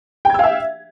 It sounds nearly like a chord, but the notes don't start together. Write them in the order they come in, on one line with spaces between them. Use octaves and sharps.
G5 G#6 E6 F5 E5